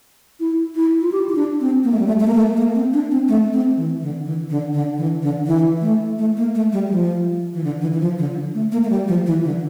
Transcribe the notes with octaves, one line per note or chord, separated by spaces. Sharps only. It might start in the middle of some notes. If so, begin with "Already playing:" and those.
E4
E4
F4
G4
E4
D4
C4
A#3
A3
G3
A3
A3
A#3
A3
A#3
C4
D4
C4
A3
C4
E3
D3
E3
D3
D3
E3
D3
E3
A3
A3
A#3
A3
G3
F3
E3
D3
E3
E3
F3
D3
A3
A#3
A3
G3
F3
E3
D3